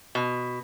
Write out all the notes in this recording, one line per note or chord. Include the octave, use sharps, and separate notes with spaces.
B2